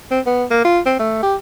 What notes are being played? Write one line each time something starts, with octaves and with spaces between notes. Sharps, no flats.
C4
B3
A#3
F4
C4
A3
G4